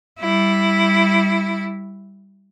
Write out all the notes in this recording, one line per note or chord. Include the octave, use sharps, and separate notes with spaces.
G3 E4